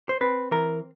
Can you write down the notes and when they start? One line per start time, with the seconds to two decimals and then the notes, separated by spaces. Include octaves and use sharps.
0.09 C5
0.21 C4 B4
0.51 E3 A#4